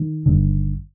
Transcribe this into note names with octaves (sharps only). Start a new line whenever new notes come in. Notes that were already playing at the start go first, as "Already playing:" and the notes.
Already playing: D#3
G1 G2 D3